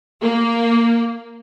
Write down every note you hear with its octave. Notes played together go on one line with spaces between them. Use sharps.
A#3